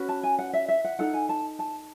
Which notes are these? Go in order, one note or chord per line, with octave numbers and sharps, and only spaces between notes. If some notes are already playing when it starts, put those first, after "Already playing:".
Already playing: C#4 F#4 B4
A5
G#5
F#5
E5
E5
F#5
D#4 A4 F#5
G#5
A5
A5